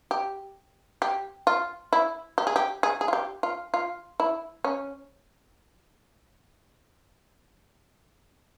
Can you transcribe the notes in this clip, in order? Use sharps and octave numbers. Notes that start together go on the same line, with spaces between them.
G4
G4
F4
E4
G4
G#4
G4
G#4
G#4
F4
G4
F4
F4
E4
C#4